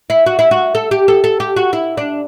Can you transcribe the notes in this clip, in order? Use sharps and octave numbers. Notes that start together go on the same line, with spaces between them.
E4
F#4
E4
F#4
A4
G4
A4
A4
G4
F#4
E4
D4